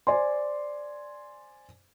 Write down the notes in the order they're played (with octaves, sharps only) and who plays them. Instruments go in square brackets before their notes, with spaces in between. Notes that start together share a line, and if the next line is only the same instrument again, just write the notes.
[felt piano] C5 D5 G#5 C6